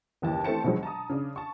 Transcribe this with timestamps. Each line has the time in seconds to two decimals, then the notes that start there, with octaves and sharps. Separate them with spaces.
0.22 F#1 D#2 E3 A5
0.44 E3 A3 C4 C5 A5 C#7
0.64 B2 D3 D#3 F3 F#3 G#3
0.83 A5 A#5 D#6
1.09 C#3 D4
1.36 A5 C#6